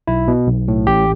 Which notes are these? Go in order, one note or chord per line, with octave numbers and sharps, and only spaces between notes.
B1 E4
B2
B1
A2
A1 G4